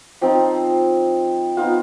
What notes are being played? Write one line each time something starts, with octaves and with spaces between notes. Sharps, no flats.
F3 C4 D#4
B3 D#4 F4